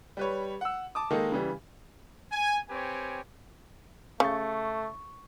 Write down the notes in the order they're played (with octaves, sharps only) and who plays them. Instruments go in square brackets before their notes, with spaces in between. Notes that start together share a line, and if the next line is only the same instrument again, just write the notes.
[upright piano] G3 B4 C#5
F#5 E6
A5 D6 D#6
D#3 G#3 A#3 D#4 A4
C#3 E3 G3
[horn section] G#5
C4 G4 B4 C#5 G#5
[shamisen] C#3 [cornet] A3 [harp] C#6 G6 A6